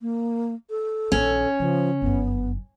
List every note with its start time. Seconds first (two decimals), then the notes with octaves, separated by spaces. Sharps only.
0.01 A#3
0.70 A4
1.12 A#1 D#3 C#4
1.60 C#3 F3
2.02 G1 F#2 B3